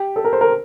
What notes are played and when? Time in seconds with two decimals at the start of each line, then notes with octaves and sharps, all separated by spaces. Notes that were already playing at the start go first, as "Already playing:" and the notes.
Already playing: G4
0.16 A4
0.24 A#4
0.33 C5
0.41 A#4